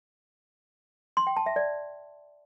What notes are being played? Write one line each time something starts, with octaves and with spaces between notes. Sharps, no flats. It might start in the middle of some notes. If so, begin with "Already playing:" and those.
C6
G5
A5
E5
D5